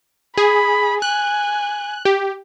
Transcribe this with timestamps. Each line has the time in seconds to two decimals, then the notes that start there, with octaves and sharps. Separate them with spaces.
0.37 G#4 B5
1.02 G#5 F#6
2.05 G4